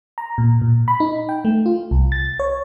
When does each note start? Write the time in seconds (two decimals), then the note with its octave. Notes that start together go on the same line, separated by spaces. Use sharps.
0.18 A#5
0.38 A#2
0.62 A#2
0.88 B5
1.00 D#4
1.29 G5
1.45 A3
1.66 F4
1.91 C2
2.12 A6
2.40 C#5